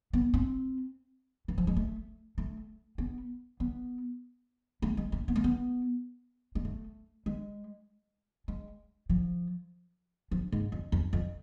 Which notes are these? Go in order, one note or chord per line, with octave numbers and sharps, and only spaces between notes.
B3
C4
E3
F3
G#3
A3
A3
B3
B3
A3
G#3
A3
B3
A3
B3
G#3
A3
G#3
G#3
F3
F3
G#2
F2
F2
F2